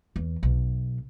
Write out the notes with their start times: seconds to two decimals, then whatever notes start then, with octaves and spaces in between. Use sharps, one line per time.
0.16 E2
0.43 B1